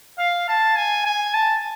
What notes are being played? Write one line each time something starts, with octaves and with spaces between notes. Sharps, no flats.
F5
A5
G#5
G#5
A5